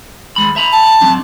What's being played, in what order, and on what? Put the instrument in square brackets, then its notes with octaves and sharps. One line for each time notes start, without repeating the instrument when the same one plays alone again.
[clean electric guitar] D#2 G#3 B5
E5 A#5 B5
[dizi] A5
[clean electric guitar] F#3 C4 D4